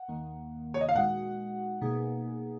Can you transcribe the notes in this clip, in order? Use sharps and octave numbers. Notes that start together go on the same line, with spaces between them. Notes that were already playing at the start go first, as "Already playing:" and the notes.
Already playing: F#5
D#2 D#3 A#3
C#5
D#5
F5
A#2 G#3 D#4 F#4 F#5
B2 A#3 D#4 G#4